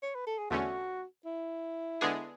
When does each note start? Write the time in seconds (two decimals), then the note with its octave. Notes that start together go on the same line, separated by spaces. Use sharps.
0.03 C#5
0.15 B4
0.27 A4
0.39 G#4
0.51 E2 D3 A3 C#4 F#4
1.25 E4
2.01 D3 G#3 B3 D4 G#4